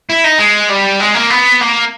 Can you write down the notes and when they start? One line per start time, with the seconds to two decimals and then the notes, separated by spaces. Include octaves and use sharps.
0.10 E4
0.24 D#4
0.39 G#3
0.70 G3
1.00 G#3
1.15 A#3
1.30 B3
1.61 A#3